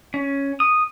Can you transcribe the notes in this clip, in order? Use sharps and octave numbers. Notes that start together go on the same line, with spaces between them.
C#4
D#6